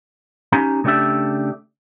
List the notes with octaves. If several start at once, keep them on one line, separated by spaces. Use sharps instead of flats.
C#4 D#4 G4 G#5 A#5
C#3 A3 D4 G4 D5 E5